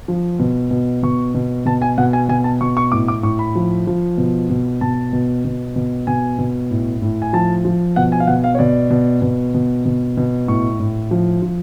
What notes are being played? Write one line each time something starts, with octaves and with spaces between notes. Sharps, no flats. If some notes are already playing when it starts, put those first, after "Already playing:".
F3
B2
B2
B2 C#6
B2
B2 A5
G#5
B2 F#5
G#5
B2 G#5
A5
B2 C#6
C#6
A2 D6
D6
A2 C#6
B5
F3
F3
B2
B2
B2 A5
B2
B2
B2
B2 G#5
B2
A2
A2
G#5
F3 A5
F3
B2 F#5
G#5
F5
B2 F#5
F5
C#5
B2 D5
B2
B2
B2
B2
B2
A2 C#6
A2
F3
F3